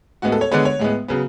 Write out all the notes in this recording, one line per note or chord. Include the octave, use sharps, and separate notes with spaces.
A2 G#3 B3 F#4
A4
C#5
D3 G#3 B3 C#5
C#5
A2 G#3 B3
C#3 F#3 B3